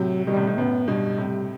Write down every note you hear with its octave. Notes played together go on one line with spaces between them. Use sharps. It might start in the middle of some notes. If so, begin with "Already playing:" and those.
Already playing: A2 C3 F#3
B2 D#3 G3
A2 C3
A2 C3
F#2 A2 B3
G2 B2 G3
A2 C3